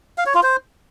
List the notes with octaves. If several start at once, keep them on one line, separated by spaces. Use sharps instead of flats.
F5
C#5
F4
C5